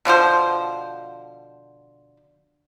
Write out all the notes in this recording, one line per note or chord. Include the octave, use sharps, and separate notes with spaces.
B2 D3 F3 C5